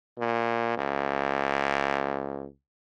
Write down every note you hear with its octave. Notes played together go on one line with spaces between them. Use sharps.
A#2
C#2